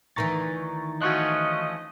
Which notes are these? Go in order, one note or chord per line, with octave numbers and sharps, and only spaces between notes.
D2 D#3 E3 A#5 C#6 A6
F3 A3 C#4 F#4 D#5 C#6 F#6